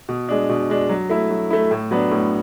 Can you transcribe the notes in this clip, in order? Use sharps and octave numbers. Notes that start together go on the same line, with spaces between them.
B2
G#3 D4
B2
G#3 D4
F#3
A3 E4
F#3
A3 E4
A2
F#3 B3 D4
A2